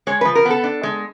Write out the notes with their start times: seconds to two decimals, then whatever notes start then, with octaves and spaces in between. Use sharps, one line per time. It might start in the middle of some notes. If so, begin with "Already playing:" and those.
0.07 G#3 C#5
0.21 F3 B4
0.35 A#4
0.45 B3
0.50 A4
0.64 D4
0.83 G#3